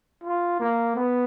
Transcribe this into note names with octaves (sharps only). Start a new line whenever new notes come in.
F4
A#3
B3